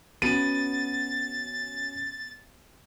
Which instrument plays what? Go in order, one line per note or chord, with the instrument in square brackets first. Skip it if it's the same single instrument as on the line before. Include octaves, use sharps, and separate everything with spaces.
[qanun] B3 [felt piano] C#4 F#4 [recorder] A6 [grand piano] D#7